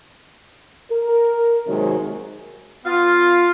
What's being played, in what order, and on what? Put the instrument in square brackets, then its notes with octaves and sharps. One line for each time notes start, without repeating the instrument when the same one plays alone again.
[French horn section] A#4
D#2 C3 D#3 F#3 G#3
[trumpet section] B3 F4 [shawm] F5